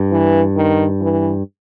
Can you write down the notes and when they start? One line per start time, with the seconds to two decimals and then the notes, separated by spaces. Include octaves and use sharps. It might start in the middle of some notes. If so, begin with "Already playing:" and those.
Already playing: G2
0.11 E3
0.56 D#3
1.01 E3